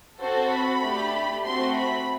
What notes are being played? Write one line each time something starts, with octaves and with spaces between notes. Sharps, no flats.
C4 F#4 A4 C5
B5
A3 D4 G4
A3 C4 F#4 C6
B5